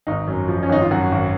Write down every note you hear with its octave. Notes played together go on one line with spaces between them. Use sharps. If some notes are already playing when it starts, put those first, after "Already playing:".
G#1 D#4
F#2
F3
C#4
G#1 D#4
F4
F#2 F#4
G#1